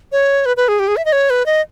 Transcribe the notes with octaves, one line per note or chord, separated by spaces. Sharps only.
C#5
B4
B4
G#4
G4
G#4
E5
D#5
C#5
B4
D#5